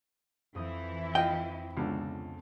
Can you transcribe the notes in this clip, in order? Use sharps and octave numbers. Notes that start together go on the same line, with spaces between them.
F2 E3 E4 D#6 G6
F4 D#5 G5
C#2 B2 D3 A5